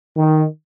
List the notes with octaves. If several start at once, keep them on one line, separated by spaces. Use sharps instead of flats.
D#3